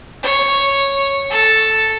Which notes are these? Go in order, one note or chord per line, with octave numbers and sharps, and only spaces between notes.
C#5
A4